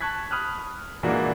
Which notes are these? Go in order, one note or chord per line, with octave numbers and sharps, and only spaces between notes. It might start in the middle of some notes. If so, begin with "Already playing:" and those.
A5 C#6 F#6 G#6 B6
B5 D#6 F6 F#6
A#2 E3 G#3 A#3 D4 F#4